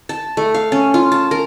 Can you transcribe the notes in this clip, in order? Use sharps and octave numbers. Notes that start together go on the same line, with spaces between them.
A5
A3
F5
C#4
F4
A5
A#4